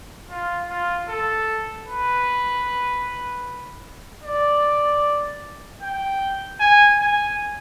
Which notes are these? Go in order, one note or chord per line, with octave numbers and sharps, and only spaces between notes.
F4
F4
A4
B4
D5
G5
G#5
G#5